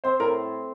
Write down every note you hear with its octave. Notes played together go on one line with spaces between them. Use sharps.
C4 C5
A2 A#4